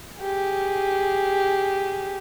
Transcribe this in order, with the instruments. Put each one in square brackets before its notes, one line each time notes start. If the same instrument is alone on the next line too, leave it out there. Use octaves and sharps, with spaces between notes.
[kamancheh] G4 G#4